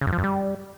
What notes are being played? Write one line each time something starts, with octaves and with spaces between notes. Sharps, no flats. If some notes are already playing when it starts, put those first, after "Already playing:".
C#3
F#2
F3
F#2
G3